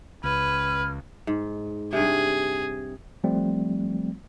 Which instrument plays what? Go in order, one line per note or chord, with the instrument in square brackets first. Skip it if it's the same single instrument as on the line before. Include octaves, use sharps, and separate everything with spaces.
[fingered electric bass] C#2 [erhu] B4 [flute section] F6 G#6
[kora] G#2
[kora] G2 C3 [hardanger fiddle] G#4
[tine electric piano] F3 G3 A3 C4